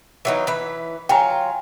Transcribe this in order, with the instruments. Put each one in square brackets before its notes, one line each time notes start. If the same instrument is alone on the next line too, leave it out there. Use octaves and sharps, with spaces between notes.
[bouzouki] E3 F#3 D#4
E3 B4
[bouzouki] F#3 F4 [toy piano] G5 G#5 A#5